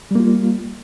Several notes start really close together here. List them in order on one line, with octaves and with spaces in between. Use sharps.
G3 A#3 F4